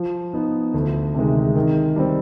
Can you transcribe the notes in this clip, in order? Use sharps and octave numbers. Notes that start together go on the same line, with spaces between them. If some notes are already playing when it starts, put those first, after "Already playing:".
Already playing: F3
B3 D#4
D2
C3 D#3 G#3
D#3
G3 C4